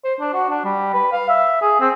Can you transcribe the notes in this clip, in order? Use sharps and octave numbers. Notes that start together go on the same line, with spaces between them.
C5
D4
F#4
D4
G3
B4
F5
E5
G#4
C4